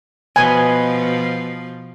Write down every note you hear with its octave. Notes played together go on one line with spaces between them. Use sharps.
B2 F3 B4 D#5 G#5